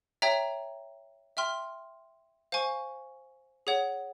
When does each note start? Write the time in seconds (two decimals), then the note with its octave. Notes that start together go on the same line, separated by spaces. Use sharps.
0.22 C#5 E5 G5 A#5
1.37 E5 G5 C6 F6
2.52 C5 F5 G#5 C#6
3.67 G#4 C#5 F#5